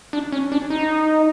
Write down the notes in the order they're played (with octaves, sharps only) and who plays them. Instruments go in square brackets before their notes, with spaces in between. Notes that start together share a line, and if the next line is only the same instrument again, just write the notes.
[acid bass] D4
C#4
D4
D#4